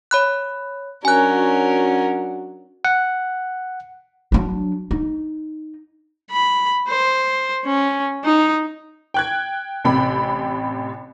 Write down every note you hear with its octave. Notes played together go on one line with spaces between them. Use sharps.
C#5 B5 F#6
F#3 C#4 D4 F#4 A#4 G#5 F#6
F#5
F#3 D4
D#4
B5
C5
C#4
D#4
G5 F#6 G#6
A1 C3 G5 B5